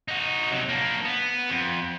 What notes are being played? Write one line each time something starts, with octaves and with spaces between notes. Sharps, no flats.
D#4 F#4
C3 F#3
A#3 D4
B3
F2